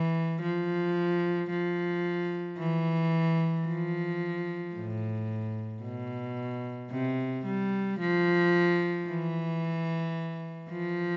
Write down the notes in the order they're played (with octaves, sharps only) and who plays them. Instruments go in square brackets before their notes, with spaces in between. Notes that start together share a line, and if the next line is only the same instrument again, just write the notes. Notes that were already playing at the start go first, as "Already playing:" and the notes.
Already playing: [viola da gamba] E3
F3
F3
E3
F3
A2
B2
C3
G3
F3
E3
F3